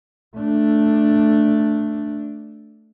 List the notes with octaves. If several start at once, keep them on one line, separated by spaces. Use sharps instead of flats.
A3 D4